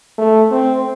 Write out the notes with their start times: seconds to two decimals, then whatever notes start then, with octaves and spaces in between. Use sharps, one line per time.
0.18 A3
0.51 C4